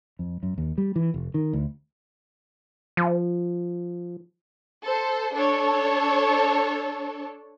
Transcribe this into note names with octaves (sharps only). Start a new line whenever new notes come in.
F2
F#2
D#2
G3
E3
F1
D#3
D2
F3
A4 C5
D4 A4 C#5